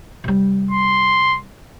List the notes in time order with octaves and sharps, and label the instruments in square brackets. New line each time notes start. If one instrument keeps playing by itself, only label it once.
[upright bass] C3 G3
[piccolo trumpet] C6